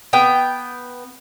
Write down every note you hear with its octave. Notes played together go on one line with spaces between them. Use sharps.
B3 G5